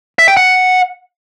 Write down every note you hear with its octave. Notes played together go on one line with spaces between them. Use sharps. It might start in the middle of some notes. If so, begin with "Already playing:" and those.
E5
G5
F#5